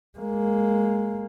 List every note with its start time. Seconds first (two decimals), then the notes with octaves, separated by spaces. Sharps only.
0.18 G#3 A#3